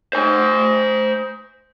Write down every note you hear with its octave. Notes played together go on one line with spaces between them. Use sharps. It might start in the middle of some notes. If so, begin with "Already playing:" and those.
C5 G#5